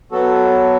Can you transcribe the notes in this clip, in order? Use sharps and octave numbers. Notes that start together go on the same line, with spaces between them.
F#3 B3 F#4 A4